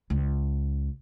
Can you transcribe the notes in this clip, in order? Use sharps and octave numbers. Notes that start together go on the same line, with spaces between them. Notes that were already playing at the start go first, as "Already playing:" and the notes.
C#2